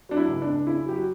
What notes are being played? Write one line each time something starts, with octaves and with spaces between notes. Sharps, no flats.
F#3 D4
E4
C#2
D4
C#2
C#3 E4
F#3 G4
F#4